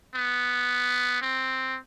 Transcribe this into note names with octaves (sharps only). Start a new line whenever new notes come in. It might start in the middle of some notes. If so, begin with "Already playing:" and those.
B3
C4